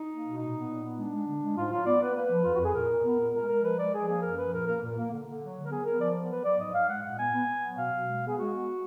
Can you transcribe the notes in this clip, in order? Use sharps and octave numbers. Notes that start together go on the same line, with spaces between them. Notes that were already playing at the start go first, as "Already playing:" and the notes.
Already playing: D#4
A#3
B2
A#2 D#4
B3
A#2
B3
G#3 D4
G#3
D3
G#3
G#2 F4
F#3 F4
B3 D5
B3 B4
A#3 B4
F3
F2 F4
F#4
F2 G#4
A#2 A#4
A#2
B3
A#2
G#3 A#4
G#3 A#4
F3 B4
G#3 D5
F3 G#4
A#3 G#4
F#2 A#4
F3 B4
A#2 A#4
A#3 A#4
A#2
A#3
D3
D3
F#3
D3
A#4
B3 G#4
B3 A#4
F3 D5
B3
F#3 B4
F#3 D5
G#2 D#5
G#2 F5
G#3 F#5
A#2 F#5
B3 G#5
B3
B3
F#3
B2 F5
B2
G#3
B3 G#4
G#3 F#4
B3